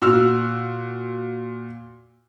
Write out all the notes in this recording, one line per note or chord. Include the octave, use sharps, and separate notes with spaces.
A#2 F#4 E6 F6